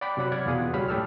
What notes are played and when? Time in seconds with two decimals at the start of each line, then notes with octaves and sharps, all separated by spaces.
0.01 D5 F#5 G5 B5 D6
0.17 C3 F#3 F#5 B5 F#6
0.32 D5 F#5 F6 G#6
0.46 E2 B2 F4 G#4 F#5 D#6
0.73 C#2 F#3 G3 B5 F6
0.88 A2 G4 A4 E6 F6